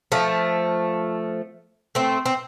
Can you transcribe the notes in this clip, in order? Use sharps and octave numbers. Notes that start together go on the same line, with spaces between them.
F3 A3
A3 C4
C4